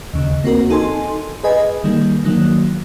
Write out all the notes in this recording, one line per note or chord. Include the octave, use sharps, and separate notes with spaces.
D#2 C#3
A#3 C4 F#4 A#4
D#4 A4 G#5 C6
G#4 B4 D#5 G#5
D#3 G3 A#3
D#3 F#3 A#3